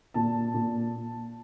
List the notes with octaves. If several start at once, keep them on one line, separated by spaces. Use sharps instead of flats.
A#2 A5
A#2